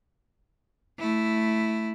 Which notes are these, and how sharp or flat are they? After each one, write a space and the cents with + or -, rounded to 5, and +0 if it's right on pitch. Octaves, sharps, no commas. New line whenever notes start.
A3 -5 E4 +0